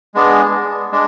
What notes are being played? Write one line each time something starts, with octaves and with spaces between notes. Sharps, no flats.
G#3 B3 D4 G#4
G#3 D4